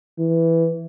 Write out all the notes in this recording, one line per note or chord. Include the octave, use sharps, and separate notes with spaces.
E3